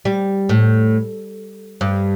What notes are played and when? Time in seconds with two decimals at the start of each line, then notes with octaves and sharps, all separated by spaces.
0.05 G3
0.49 A2
1.81 G2